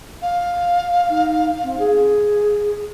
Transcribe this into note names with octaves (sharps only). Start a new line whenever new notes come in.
F5
D#4
C4
G#4